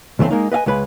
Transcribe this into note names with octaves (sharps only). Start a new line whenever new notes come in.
C#2 E3 A3 A#3 C4
G#3 A#3 D#4
B4 D#5 F5 G#5
C#2 G#3 B4 B5